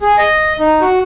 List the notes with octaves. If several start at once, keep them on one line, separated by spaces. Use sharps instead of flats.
G#4
D#5
D#4
F#4